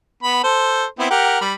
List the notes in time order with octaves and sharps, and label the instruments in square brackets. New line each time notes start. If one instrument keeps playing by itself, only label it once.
[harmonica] B3 B5
A4 C5
B3 C4 E4
G4 A#4 F#5
G3 B5